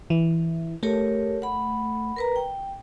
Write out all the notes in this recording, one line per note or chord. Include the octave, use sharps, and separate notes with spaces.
E3
A3 G4 A#4 C#5
F#5 B5
A#4 B4 A#5
G5